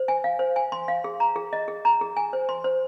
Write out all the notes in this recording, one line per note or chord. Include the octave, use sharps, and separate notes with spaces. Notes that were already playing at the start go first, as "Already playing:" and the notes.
Already playing: C5
G#5
F5
C5
G#5
C6
F5
G#4
A#5
G#4
D#5
G#4
A#5
G#4
G#5
C5
C6
C5